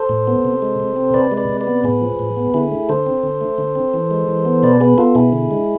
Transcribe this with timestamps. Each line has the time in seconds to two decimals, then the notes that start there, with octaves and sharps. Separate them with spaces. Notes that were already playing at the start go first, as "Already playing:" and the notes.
Already playing: A4 C5
0.09 A2
0.28 B3
0.45 C3
0.62 G#3
0.80 C3
0.96 C4
1.14 C3 B4 D5
1.32 G#3
1.37 B4 D5
1.49 C3
1.61 B4 D5
1.67 B3
1.84 A2 G#4 B4
2.02 F3
2.19 A2
2.37 B3
2.54 D3 E4 G#4
2.72 A3
2.89 D3 A4 C5
3.06 C4
3.23 D3
3.41 A3
3.58 D3
3.76 C4
3.94 E3
4.11 G#3
4.29 E3
4.45 B3
4.63 B2 B4 D5
4.80 B3 G#4 B4
4.98 B3 F4 A4
5.15 B2 E4 G#4
5.33 D3
5.51 G#3